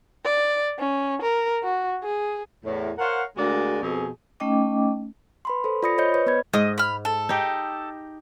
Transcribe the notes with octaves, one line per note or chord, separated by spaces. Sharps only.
D5
C#4
A#4
F#4
G#4
E2 A2
A#4 C5 C#5 F5 F#5
D2 G#3 A#3 F#4 G#4 D5
F2 B2 G#4
A3 C#4 D#4 D#5 G5 D6
B4 B5 C6
A4 C5
F4 D5 B5 D#6 A#6 C#7
C5 C#5 D#5 G6 C#7
B4 C#5 D#5
B3 B4 B5 G#6
G#2 D#5
B5 F6
A4
D#4 G4